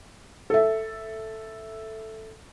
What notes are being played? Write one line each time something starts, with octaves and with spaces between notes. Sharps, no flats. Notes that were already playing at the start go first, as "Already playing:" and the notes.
A4 E5